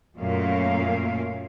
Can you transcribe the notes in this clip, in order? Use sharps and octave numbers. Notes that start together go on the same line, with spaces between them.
F#2 A#2 A3 A#3 C#4 F5